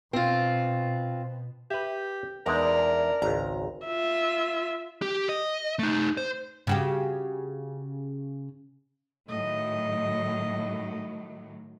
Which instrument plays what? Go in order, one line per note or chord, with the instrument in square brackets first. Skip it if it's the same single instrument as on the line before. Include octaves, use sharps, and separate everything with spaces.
[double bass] B2 [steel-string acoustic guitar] C4 F4
[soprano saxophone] G4 [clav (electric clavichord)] B4 E5
[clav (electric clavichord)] E2 G#3 D#4 [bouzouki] D4 [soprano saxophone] A#4
[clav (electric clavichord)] G#1 C#2 [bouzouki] A#5
[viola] F4 E5
[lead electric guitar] G4
D#5
A3 D#4
C5
[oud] C#3 F#4 G4
[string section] A2 D#3 F#3 [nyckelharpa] D#5